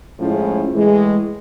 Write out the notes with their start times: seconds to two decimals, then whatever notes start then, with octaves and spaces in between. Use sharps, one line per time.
0.18 A2 F3 G#3 C#4 E4
0.73 A2 E3 G#3